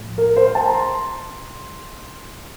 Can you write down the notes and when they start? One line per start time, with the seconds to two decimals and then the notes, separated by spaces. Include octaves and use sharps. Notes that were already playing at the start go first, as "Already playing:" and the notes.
Already playing: A2 F3 A3
0.18 A#4
0.36 C5
0.55 A5
0.66 A#5
0.74 C6